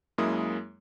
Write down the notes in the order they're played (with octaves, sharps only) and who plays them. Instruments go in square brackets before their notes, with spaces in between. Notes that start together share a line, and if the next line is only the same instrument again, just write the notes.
[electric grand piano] F#2 G#3 A#3 E4 D#6